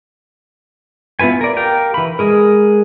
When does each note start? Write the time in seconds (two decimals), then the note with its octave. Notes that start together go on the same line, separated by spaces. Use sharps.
1.19 B3 E4 F4 B4 G#5
1.41 A#4 D5
1.57 G4 A#4 F5 G5
1.94 E3 B5
2.19 G#3 G#4 A#4